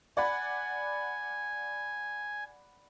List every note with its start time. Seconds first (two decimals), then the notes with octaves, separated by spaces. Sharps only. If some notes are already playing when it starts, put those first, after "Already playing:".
0.17 D5 F#5 G#5 B5